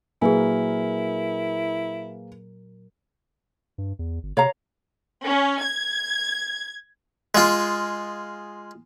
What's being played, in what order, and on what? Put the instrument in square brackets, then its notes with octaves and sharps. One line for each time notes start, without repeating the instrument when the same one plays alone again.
[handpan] A#2 F#3 A#4 [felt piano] A#3 [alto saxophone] E4 [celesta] G#4 B4 G#5
[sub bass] G2
E2
G1
[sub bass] C3 [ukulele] C#5 F5 A#5
[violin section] C#4
G#6
[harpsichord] G#3 F4